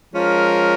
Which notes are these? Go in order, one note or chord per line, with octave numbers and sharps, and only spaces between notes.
F3 G#3 C#4 F4 A#4